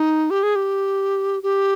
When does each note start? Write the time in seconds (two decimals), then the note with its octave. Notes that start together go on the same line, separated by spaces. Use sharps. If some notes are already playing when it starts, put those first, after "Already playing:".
Already playing: D#4
0.30 G4
0.43 G#4
0.55 G4
1.43 G4